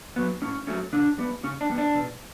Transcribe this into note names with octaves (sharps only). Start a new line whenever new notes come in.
F#3 B3
A2 C#4
F#3 A3 C#4
C#3 D4
G3 B3
C#3 C#4
D4
G3 B3
D4
B2